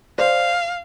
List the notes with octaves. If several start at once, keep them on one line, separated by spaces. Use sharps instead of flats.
C5 D5 F5